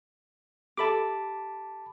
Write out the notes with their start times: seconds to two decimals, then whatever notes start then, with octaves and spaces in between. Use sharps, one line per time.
0.77 G4 A4 E5 A5 B5 D6